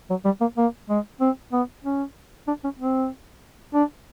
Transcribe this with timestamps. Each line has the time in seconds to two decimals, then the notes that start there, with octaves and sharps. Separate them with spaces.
0.10 F#3
0.25 G3
0.40 A#3
0.57 A#3
0.89 G#3
1.20 C4
1.52 B3
1.84 C#4
2.47 D4
2.64 C#4
2.79 C4
3.74 D4